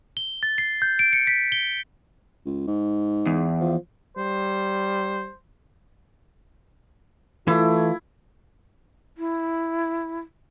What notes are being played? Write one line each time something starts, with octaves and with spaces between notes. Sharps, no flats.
G7
A6
C7
G6
D7
C#7
B6
G7
C#2
G#2
E2
F3
G3 C5
E3 A3 E4 F4
E4